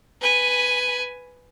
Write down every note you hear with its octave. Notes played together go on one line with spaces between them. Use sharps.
B4 G#5